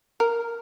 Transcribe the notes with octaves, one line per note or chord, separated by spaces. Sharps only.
A#4